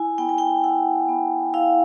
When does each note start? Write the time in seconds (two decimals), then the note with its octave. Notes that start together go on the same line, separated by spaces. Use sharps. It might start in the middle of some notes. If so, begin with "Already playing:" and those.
Already playing: E4 G#5
0.18 B3 G5
0.29 G#5
0.38 G5
0.63 E4 F#5
1.08 B3
1.54 E4 F5